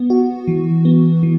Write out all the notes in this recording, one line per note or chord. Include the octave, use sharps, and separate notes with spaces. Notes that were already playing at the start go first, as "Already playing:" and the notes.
Already playing: B3
F#4
E3
B3
E3